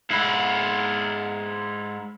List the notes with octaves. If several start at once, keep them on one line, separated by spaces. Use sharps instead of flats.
G#2 E4